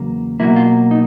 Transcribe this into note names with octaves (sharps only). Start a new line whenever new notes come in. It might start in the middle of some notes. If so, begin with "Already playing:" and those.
Already playing: E2 C#3 F#3 A#3
B2 F#3 A#3 E4
F4
D#4